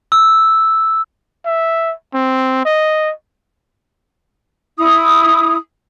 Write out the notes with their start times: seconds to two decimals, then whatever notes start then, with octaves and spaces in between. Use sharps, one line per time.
0.12 E6
1.45 E5
2.14 C4
2.65 D#5
4.78 E4 D#6